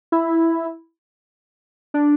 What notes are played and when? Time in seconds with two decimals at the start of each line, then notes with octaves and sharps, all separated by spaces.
0.12 E4
1.94 D4